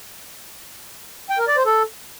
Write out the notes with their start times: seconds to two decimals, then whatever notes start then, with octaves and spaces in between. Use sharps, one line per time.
1.30 G5
1.39 A#4
1.48 D5
1.57 C5
1.66 A4